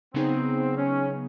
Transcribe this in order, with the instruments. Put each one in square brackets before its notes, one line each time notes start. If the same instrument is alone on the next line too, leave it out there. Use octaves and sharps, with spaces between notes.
[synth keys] C#3 F#3 B3 D#4 G#4 [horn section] C4
[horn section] C#4